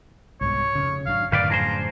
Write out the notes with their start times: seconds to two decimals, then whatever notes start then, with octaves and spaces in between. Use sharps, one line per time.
0.41 C2 G#2 B2 C#5
0.75 F1 C#3
1.06 G#1 F#3 D4 F5
1.32 F#2 A2 D3 D#3 B4 D5 F5
1.50 F3 G#4 C5 A#5